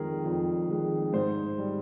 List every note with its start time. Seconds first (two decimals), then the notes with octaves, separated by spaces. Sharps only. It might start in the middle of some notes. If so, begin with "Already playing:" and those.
Already playing: F2 D#3 G#3 G#4 A#4
0.25 F2
0.69 D#3 G#3
1.13 G#2 C5
1.58 G3